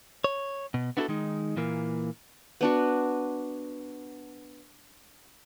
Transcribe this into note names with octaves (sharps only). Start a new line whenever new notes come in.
C#5
B2
B3 D4 E4 F#4 G4 A4
D#3 G#3 D#4
A#2 E3 A#3
B3 D4 F#4